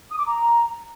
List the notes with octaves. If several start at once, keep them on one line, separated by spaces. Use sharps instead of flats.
D#6
D6
A#5